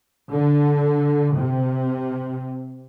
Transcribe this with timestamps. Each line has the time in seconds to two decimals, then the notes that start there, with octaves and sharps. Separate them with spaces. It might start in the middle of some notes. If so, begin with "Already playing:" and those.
0.31 D3
1.35 C3